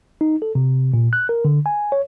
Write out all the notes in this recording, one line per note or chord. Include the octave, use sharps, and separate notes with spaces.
D#4
A4
C3
A#2
F#6
A#4
D3
G#5
C#5